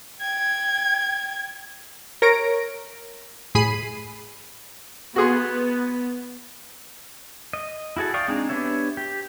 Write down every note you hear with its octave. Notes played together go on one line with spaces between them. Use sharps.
G5 G#6
A#4 C#5 A#6 D7
A2 G#4 B5 C7 D#7
B3 F#4 G#4 C6
D#5
E4 F#4 G#4 A4
D5 F5 G5 C#6 D#6
G#3 C4 D4 D#4 G#4
B3 D4 G4 C#5 E5
G4